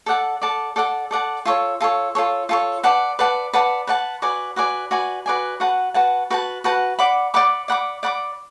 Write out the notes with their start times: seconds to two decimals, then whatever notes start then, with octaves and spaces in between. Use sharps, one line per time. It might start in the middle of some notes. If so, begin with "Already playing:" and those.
0.06 A4 D5 F#5 A5
0.42 A4 D5 F#5 A5
0.76 A4 D5 F#5 A5
1.11 A4 D5 F#5 A5
1.45 F4 A4 C#5
1.81 F4 A4 C#5
2.15 F4 A4 C#5
2.49 F4 A4 C#5
2.83 B4 D5 F#5 A5
3.19 B4 D5 F#5 A5
3.53 B4 D5 F#5 A5
3.87 B4 D5 F#5 A5
4.22 F#4 B4 D5 G#5
4.56 F#4 B4 D5 G#5
4.91 F#4 B4 D5 G#5
5.26 F#4 B4 D5 G#5
5.60 F#4 B4 F#5 A5
5.94 F#4 B4 F#5 A5
6.30 F#4 B4 F#5 A5
6.64 F#4 B4 F#5 A5
6.99 D5 F#5 B5 D6
7.34 D5 F#5 B5 D6
7.68 D5 F#5 B5 D6
8.03 D5 F#5 B5 D6